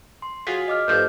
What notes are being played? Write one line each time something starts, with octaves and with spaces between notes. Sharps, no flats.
C6
F#3 F4 G#4 B6
D#5 D6 F6
G2 F3 A3 G6